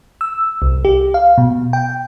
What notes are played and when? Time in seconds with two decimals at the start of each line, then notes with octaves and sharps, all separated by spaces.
0.21 E6
0.62 C2
0.85 G4
1.14 F5
1.38 B2
1.73 G5